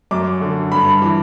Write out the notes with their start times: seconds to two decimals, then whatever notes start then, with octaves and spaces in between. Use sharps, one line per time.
0.11 F#2 D6
0.41 D3
0.71 G2 B5
1.02 E3